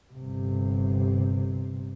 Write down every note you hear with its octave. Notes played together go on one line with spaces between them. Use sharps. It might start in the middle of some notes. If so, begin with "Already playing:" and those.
G1 C3